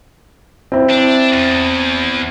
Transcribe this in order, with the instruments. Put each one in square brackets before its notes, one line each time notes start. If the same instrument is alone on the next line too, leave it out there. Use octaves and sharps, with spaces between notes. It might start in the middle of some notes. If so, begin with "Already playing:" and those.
[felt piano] C4 E4
[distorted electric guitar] D4
E2